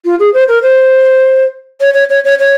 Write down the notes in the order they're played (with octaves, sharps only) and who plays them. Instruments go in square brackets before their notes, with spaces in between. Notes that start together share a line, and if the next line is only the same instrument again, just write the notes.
[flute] F4
G#4
C5
A#4
C5
C#5
C#5
C#5
C#5
C#5